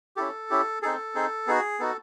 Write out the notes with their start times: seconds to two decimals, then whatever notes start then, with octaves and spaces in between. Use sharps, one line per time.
0.16 C#4 E4 G4 A4
0.50 C#4 E4 G4
0.82 C4 D#4 G#4 A4
1.15 C4 D#4 G#4
1.47 B3 D#4 F#4 G#4
1.80 B3 D#4 F#4 A4